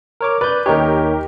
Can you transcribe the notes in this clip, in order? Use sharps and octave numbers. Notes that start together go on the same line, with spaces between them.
A#4 C#5 D6
B4 D5 G6
D#2 D#4 G4 A#4 C#5